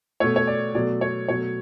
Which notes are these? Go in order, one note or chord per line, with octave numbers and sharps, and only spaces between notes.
B2 A3 C#5
C#5
D5
B2 F#3 A3 D5
C#5
B2 F#3 A3 C#5